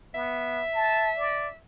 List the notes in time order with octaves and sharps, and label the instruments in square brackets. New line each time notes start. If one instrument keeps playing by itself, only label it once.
[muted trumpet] B3 [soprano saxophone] E5
[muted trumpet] A5
D5